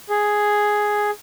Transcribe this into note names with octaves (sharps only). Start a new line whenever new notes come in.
G#4